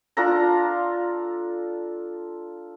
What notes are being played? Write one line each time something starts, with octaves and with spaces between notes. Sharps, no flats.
D4 F4 A4 A#5